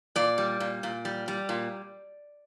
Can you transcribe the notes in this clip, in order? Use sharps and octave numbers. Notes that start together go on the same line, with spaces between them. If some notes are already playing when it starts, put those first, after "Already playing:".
A#2 D5
G3
A#2
A#2
G3
G3
A#2